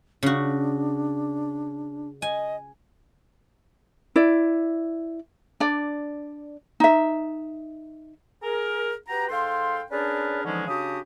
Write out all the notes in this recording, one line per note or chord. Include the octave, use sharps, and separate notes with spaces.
C#3 D4 F#4
D#5 G#5
E4 D5
D4 D5
D#4 E5
G#4 A#4
F#4 G4 B4 G5 A#5
G#2 A4 F5 G5 C6
C#4 D4 G#4 A#4 B4 D5
D3 E3 F3 G#3 C#4 D#4
C#3 D4 F#4 G4 D#6